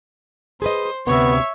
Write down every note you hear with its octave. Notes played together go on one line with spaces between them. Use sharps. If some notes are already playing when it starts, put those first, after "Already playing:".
G#4 B4 C5 D#5
D2 C3 B3 C#5 E5